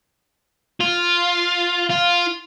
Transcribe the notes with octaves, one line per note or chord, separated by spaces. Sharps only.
F4
F4